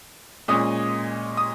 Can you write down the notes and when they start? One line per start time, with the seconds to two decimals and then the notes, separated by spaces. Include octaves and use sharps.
0.48 A#2 G#3 C#4 D#6
1.37 D#6